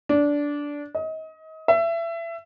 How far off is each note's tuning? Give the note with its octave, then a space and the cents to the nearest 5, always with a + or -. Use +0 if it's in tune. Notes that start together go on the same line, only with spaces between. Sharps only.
D4 -15
D#5 +30
E5 +25